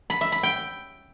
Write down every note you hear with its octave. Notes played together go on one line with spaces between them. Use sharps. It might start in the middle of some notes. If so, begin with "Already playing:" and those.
B5
E5
B5
G5